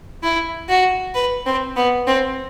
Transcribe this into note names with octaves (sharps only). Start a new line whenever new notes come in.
E4
F#4
B4
C4
B3
C4